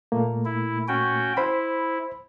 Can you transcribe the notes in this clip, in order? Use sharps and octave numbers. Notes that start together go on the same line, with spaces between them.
A#2 A3 A#3
E4
C#4 F#4 G5
E4 C5 B5